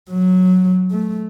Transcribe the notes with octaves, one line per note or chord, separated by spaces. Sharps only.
F#3
A3